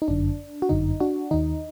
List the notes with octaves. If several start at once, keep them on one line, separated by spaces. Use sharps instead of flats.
D#4
G1 F#2 D3 D4
F#4
G1 F#2 D3 D#4
D4 F#4
D#2 D#3 D#4